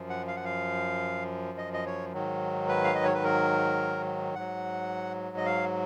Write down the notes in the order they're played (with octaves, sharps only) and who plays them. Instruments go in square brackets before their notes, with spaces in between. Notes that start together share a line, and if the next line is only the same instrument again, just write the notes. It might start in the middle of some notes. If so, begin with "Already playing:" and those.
Already playing: [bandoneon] F#2 F3
F#5
F5
F#5
F5
D#5
D#5
C#5
G#2 D#3 F#3
B4
F5
D#5
C#5
B4
A#4
G#2 F#3 F#5
D#5
F5